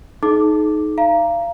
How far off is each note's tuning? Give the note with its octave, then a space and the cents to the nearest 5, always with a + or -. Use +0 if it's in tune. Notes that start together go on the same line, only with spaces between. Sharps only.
D#4 +0 G#4 +45 D6 +0
F5 -35 A#5 +0